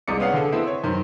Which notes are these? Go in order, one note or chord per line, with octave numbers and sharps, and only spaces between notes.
C2 C3 G#3 D5 D#6 C#7
B3 C#4 F5 F#5
D3 G#4 A4
B3 C4 E4
C#5
F#2 D#3 C5